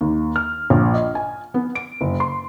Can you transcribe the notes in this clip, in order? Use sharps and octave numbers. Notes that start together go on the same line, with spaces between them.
D#2
F6
A#1
D#5
G#5
B3
D7
F#1
C6